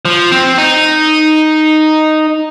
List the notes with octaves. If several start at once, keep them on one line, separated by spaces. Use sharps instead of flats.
F3
C4
D#4